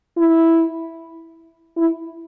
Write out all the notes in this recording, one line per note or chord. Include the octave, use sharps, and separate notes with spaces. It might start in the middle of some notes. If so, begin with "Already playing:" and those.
E4
E4